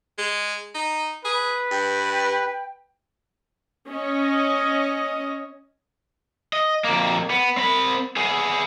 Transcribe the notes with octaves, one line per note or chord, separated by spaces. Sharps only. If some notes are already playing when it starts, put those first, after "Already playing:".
G#3
D#4
G#4 B4
G2 G5
C#4 D#5
D#5
F2 A#3
B3
C4 B5
B3 G#4